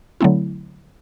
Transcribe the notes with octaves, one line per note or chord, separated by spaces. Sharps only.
D3 F#3 A3 C4 E4